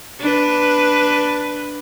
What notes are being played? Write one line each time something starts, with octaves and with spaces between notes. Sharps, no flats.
D4 B4